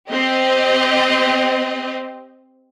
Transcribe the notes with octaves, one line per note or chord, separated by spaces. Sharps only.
C4 G4 D#5